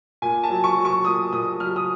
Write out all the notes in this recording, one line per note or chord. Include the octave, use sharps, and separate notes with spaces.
A#2 G#5
A5
F#3
C#6
F#3
C#6
A#2 D#6
A#2 D#6
F#3 F6
D#6